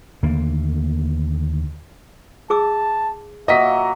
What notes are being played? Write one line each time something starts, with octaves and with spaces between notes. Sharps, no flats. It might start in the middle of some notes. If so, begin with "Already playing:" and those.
D#2 D3 A3 A#3
G#4 A5 D6 E6
A#2 F#3 A#3 D#5 E5 B6